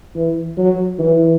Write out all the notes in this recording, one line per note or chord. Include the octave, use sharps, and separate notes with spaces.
E3
F#3
E3